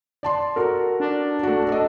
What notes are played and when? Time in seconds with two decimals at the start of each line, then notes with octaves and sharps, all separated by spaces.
0.23 D5 A5 C6
0.56 F#4 A4 A#4
1.00 D4
1.43 A3 F#4
1.68 A4 D#5